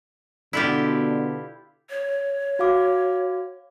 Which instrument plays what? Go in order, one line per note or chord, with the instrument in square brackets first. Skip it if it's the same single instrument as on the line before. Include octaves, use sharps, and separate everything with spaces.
[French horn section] B2 D3 [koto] E4 F4 G4
[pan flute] C#5
[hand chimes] F#4 F5 D6